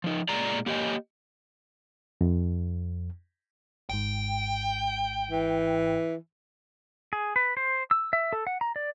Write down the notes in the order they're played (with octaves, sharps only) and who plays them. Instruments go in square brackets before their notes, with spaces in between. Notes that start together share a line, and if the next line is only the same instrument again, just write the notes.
[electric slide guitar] F3 D#4
A#2 G#3 D5 A#5
A#3 G4 C#5 D#5 G#5
[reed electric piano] F2
[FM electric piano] G#1 G#2 [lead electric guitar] G5
[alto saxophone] E3
[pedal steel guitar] G#4
B4
C5
E6
E5
A4
F#5
A#5
D5